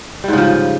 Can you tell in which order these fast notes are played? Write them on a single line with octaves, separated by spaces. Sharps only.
G3 G#2 C#3 F3